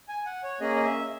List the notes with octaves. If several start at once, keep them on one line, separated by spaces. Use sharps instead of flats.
G#5
F#5
C#5
A#3 C#4 G#4 D#5
D#5
E5